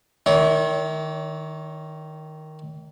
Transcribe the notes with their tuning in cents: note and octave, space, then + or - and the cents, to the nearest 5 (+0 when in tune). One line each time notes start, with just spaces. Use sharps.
D#3 +0 E4 -35 C#5 +40